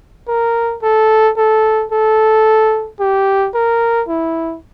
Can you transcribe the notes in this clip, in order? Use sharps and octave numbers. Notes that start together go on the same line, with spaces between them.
A#4
A4
A4
A4
G4
A#4
E4